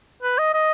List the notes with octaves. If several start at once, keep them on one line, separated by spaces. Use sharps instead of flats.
B4
D#5
D#5